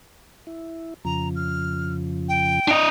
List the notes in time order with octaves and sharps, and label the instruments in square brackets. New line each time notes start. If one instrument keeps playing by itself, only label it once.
[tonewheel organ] E4
[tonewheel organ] F2 C#3 F3 [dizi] A#5
[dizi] F6
G5
[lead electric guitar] D4 D#5